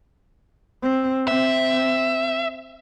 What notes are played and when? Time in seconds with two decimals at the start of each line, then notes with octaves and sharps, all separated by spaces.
0.83 C4
1.28 C4 E5